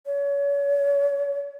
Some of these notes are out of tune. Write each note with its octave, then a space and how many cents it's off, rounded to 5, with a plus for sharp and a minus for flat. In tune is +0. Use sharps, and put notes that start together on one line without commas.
C#5 +35